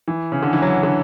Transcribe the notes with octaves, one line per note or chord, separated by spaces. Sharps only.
E3
C#3
D3
E3
F#3
D3